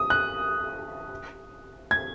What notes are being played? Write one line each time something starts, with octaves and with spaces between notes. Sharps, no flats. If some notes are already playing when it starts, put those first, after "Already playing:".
Already playing: D#6
F#6
G#6